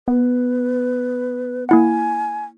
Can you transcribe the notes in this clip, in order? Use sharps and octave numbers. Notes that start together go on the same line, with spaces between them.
B3 B4
A#3 E4 F#5 G#5